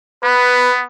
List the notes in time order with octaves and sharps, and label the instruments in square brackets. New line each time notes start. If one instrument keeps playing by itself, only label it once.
[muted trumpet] B3 [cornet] B4